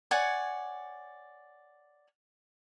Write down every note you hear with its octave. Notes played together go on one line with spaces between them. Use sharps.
C#5 D5 F#5 G#5